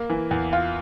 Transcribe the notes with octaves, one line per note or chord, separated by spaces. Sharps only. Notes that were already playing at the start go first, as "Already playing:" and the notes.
Already playing: A#3
E3
E2
F4